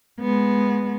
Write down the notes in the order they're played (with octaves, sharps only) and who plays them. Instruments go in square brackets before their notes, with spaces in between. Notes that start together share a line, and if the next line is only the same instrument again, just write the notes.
[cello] G#3 B3